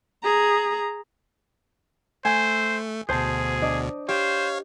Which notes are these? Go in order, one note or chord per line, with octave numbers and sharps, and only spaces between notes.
G#4 A#5
A3 C5 G#5 E6
D2 B2 G#4 C5 A5
D4 D#5
G4 C5 C#5 F5